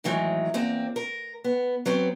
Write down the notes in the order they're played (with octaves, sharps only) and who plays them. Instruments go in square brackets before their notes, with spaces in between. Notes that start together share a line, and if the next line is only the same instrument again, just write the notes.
[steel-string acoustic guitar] A2 D#3 E3 F#3 G#3
E2 A#3 C4
A#4
B3
F#3 B3 C4